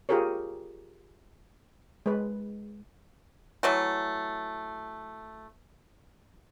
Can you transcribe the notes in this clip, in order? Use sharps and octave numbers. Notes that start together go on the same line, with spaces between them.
F4 G4 G#4 A#4 C#5
G#3 B4
E3 F#3 A3